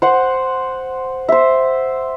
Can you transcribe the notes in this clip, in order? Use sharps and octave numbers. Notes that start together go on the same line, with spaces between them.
C5 F#5
C5 E5